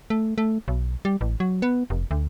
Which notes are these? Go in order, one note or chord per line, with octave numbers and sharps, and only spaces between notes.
A3
A3
B1
G3
A1
F#3
B3
F1
D2